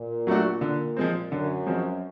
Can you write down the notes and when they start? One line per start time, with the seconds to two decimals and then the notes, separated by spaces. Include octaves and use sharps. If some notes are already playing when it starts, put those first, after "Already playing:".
Already playing: A#2
0.27 F#3 A3 D4 F#4
0.61 D3
0.97 F3 G#3 C4
1.31 F#2 D3
1.66 F3 G#3 C4